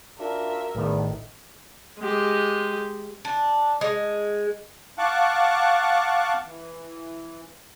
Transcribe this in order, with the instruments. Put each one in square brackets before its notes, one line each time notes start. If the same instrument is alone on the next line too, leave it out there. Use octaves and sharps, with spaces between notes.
[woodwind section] D4 F4 F#4 [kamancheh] A#4 E5
[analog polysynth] A1 A2 D#3 [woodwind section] E2
[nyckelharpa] G#3 G4
[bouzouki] D4
G#3
[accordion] F5 F#5 A5 C#6 D6 F#6
E3